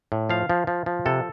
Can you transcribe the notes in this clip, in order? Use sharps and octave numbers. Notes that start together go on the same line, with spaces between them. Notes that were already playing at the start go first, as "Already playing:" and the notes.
A2
F3 F5
F3
F3
F3
C3 A4